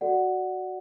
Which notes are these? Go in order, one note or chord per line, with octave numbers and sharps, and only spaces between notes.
F#4 A4 D5 F#5